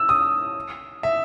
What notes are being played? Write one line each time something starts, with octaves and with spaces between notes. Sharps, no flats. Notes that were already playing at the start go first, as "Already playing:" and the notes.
Already playing: E6
D#6
E5